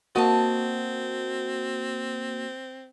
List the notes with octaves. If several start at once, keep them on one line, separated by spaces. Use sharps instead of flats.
A#3 C4 F#4 D#5 A5